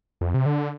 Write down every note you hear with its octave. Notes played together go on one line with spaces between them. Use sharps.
F2
C3
D3